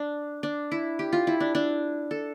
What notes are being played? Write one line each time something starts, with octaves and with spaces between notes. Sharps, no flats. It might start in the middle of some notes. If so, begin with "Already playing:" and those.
Already playing: D4
D4
E4
G4
F4
E4
D4
D4
A4